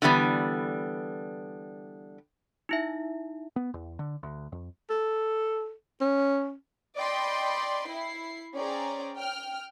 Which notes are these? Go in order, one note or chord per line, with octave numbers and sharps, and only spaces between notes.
D3 E3 G3 B3
D#4 E4 E5
B3
E2
D3
D2
F2
A4
C#4
D5 D#5 G5 B5 C6
E4 C7
C#4 G#4 C5 D5 G5 A#5
G5 F6